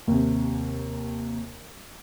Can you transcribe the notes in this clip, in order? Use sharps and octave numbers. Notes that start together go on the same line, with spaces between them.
D#2 C3